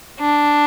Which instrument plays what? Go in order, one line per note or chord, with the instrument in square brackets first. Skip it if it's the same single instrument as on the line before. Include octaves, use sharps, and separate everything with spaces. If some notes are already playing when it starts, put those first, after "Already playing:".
[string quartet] D4